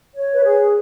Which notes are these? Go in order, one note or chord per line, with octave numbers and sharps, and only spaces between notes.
C#5
B4
G#4